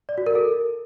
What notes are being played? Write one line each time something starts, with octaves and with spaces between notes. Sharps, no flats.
D5
F#4
A#4
A4
A#4